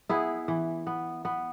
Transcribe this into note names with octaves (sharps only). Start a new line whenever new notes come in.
B3 E4 G#4
E3
B3
B3